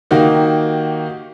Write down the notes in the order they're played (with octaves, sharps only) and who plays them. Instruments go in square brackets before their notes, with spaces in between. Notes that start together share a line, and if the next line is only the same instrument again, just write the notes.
[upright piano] D#3 A#3 D#4 F#4 G4